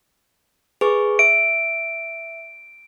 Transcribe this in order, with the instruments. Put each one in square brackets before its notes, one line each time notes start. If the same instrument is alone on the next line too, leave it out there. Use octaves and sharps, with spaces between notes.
[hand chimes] G#4 B4 C#6
[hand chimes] E5 [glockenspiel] D7